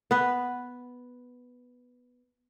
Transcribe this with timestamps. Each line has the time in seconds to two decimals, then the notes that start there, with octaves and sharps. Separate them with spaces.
0.11 B3 B4